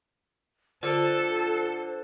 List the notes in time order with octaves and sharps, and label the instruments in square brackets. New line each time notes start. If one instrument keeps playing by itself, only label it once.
[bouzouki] D3 [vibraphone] F4 [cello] A4 [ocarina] C5